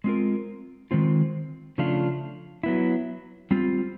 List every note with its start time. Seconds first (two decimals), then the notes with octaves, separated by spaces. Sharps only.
0.04 G#3 C4 F4 A#4
0.91 D#3 G#3 C4 F4
1.78 C#3 F3 A3 D4 F4
2.63 F#3 B3 E4
3.51 G3 C4 F4